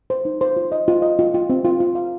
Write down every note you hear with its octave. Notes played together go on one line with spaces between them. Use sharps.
C5
D#4
C5
F4
D#5
F4
D#5
F4
F4
C4
F4
F4
F5